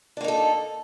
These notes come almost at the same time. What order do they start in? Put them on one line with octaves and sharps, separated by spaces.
D4 A#3 D#4 A4